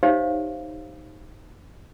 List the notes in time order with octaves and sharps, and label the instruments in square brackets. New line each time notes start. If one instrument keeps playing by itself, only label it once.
[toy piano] D#4 G4 C5 C#5 E5 F5